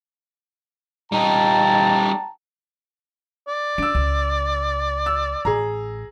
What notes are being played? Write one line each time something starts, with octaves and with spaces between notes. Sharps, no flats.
G3 D#4 G5 A5 A#5
D5
D4 E6 D7
C#2
E6
A1 G#4 A#5